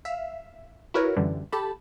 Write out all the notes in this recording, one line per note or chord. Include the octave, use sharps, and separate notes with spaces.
E5 F5
E4 F#4 A#4 B4 C#5
F#2 D3 E3 G3
G4 A4 A5 B5